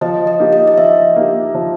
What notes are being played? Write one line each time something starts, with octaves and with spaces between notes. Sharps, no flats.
F3 D#5
D#5
A#3 D#4 G4
D#5
D#5
F3 E5
A#3 D#4 G4
F3